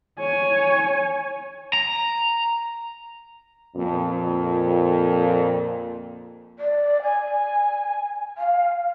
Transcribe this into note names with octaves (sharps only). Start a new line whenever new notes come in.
C#5 G#5
A#5
F2 A#2
D5
G#5
F5